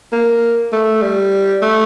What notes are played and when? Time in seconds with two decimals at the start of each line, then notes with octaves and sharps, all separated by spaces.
0.12 A#3
0.72 A3
1.02 G3
1.62 A3